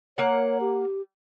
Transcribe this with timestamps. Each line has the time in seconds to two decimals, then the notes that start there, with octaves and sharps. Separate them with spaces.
0.18 A#3 C#5 F#5
0.61 G4